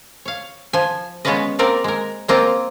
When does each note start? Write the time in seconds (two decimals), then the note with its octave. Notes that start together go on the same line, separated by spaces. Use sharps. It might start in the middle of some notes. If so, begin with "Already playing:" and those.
0.25 C#5 F5
0.73 F3 G#5
1.25 G#3 B3 C#4 F4 B4 D#5
1.59 A#3 C4 A#4 D5
1.84 G#3 A#4
2.28 G#3 A#3 C4 F4 D#5 G5